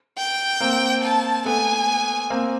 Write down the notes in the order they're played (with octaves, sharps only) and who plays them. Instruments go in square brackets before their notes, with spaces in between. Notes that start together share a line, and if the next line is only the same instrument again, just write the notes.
[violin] G5
[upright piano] A#3 C4
[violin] A5
[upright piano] A3 B3 [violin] G#5
[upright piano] A#3 C4